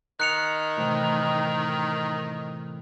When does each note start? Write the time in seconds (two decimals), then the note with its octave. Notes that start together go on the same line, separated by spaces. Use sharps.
0.20 D#3 D#5 F#6 C#7 F7
0.77 A2 C3 E3